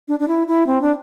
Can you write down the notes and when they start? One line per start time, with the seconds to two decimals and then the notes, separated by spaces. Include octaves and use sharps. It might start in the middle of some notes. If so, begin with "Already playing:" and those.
0.08 D4
0.20 D4
0.28 E4
0.48 E4
0.67 C4
0.82 D4